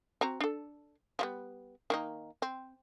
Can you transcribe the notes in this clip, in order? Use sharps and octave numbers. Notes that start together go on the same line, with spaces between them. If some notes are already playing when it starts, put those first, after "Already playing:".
C4 F#4 A#5
D4 A4
F3 G3 B3
D#3 A#3 D#4
C4